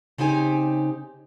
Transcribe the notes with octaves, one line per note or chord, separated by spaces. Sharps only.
C#3 C4 D#4 G4 G#5